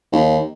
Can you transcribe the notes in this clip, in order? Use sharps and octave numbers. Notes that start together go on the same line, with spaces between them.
D#2